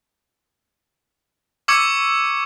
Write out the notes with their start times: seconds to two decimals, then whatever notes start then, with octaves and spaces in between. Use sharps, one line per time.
1.68 C#6 D6 E6 G#6 C#7